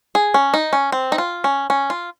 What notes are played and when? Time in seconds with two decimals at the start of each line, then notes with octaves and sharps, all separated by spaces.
0.15 G#4
0.34 C#4
0.54 D#4
0.73 C#4
0.92 C4
1.12 D#4
1.18 F4
1.44 C#4
1.70 C#4
1.90 F4